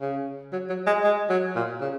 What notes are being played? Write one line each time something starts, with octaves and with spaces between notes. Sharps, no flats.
C#3
F#3
F#3
G#3
G#3
F#3
A#2
C#3